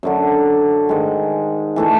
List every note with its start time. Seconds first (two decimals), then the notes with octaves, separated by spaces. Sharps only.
0.03 F#2 D3 F#3
0.89 G#2 D#3 G#3
1.76 E3 A3 D4